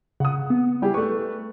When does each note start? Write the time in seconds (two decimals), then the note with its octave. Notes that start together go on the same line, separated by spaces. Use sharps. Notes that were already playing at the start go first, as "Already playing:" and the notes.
0.20 C#3 F#5 D#6
0.50 B3
0.82 G3 E4 G4 G#4
0.94 A3 B4 C#6